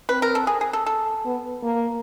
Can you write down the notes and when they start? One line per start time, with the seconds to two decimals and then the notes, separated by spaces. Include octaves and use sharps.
0.09 C4 B4
0.22 A#4
0.35 A4
0.47 G#4
0.61 G#4
0.73 A4
0.86 A4
1.25 B3
1.64 A#3